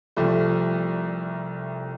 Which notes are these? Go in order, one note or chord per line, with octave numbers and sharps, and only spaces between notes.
C2 F3 G3 A3